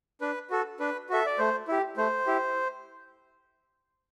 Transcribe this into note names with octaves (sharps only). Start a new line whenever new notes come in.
D4 B4
F#4 A4
D4 B4
F#4 A4 E5
D5
A3 C5
E4 G4
A3 C5
E4 G4